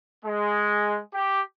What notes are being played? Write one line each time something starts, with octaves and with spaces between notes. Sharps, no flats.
G#3
G4